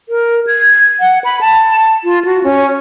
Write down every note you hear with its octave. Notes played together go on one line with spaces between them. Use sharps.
A#4
G#6
F#5
B5
A5
F4
F#4
C#4